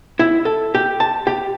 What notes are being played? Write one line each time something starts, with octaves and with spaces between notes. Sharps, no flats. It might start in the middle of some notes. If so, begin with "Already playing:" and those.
E4
A4
G4
A5
G4